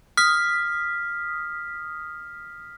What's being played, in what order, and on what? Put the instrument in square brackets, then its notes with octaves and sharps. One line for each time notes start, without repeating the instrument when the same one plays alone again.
[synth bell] D#6 B6 [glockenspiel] F6